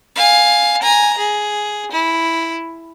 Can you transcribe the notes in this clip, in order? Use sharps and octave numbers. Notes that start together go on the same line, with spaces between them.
F5 G#5
G#5 A#5
G#4
E4